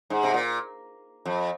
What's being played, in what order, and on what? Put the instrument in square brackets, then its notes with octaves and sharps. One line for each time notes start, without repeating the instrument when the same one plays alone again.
[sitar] G#2
C3
A#2
F2